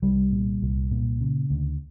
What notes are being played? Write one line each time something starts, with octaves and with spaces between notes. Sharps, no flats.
C2 G3
A#2
C2
A#2
C#3
D2